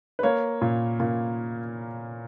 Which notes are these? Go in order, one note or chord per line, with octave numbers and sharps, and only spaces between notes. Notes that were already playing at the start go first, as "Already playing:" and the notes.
B4
A#3 C#5
A#2
A#2